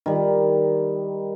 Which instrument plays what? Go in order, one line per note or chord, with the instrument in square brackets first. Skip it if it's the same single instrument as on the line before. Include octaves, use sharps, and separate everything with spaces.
[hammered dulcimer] D#3 G3